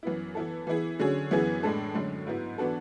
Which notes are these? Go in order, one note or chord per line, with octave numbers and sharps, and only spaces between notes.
F#2 E3 B3 E4
E3 B3 E4 A4
E3 B3 E4 G#4
D3 F#3 C#4 G#4
F#2 E3 B3 E4 G#4
A2 G#3 D4 A4
F#2 D3 G#3 C#4
G#2 F#3 B3 E4
E3 B3 D4 F#4 A4